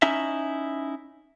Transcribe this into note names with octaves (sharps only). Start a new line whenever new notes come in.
C#4 D#4 E4 E5